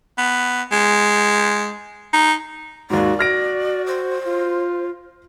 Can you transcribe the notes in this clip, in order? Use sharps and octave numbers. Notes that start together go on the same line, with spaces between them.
B3
G#3
D#4
D#2 G#2 F#4 D5
F#4 F6 A#6 D7
C5
F4